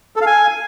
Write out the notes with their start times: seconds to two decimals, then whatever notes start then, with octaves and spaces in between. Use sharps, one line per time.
0.16 A4
0.21 F5
0.26 G#5